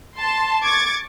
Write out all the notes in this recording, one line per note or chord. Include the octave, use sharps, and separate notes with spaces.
A5 C6
C#6 D6 G#6 A6